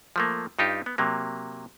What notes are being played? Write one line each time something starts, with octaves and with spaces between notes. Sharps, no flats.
F3 A3 A#3
G2 D#4 F4 G4
B3
C3 F#3 A#3